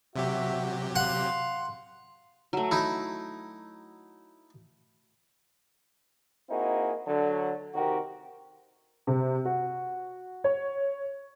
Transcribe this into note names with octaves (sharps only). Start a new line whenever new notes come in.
C3 F#3 F#4 G4 E5
F5 F#5 C6
F#3 A3
D#4 E4
A#3 C4 D#4 E4 F#4 G#4
D3 F#3 D4
C3 D#3 C4 F#4 G4 A#4
C3
F#4
C#5